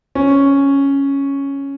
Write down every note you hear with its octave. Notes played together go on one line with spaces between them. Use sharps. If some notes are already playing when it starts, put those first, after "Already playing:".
C#4